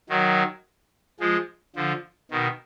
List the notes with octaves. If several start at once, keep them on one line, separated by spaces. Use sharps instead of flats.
D#3 F#3
F3 G#3
D3 F3
B2 D#3